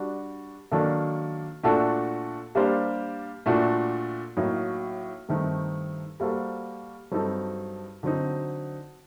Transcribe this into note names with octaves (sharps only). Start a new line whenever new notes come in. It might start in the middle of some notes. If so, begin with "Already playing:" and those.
Already playing: G3 D4 F#4
D#3 F#3 A#3 D4 A4
A#2 A3 D4 F#4 A4
G3 A#3 D4 G4 C5
A#2 A3 D4 F#4
A2 F#3 A#3 D#4
G2 D#3 A3 C4 D#4
G3 A#3 F#4 A4 C5
G2 F#3 C4 D#4 A4
D3 F#3 C4 D#4